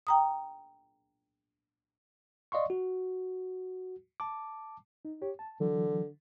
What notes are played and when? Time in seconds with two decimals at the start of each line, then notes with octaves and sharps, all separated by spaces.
0.07 G5 A#5 D#6
2.52 D5 D#5 F5 C6 C#6
2.70 F#4
4.20 A5 D6
5.05 D#4
5.22 G4 C#5
5.39 A5
5.60 D3 E3 F#3